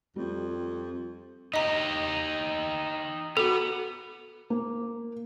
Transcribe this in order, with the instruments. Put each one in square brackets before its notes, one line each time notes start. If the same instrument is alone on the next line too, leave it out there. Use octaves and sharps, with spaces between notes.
[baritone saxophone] F2 [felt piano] G3
[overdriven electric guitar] D#4 G4 [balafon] D#5 A#5
[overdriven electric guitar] B3 [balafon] F#4 A4
[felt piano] A#3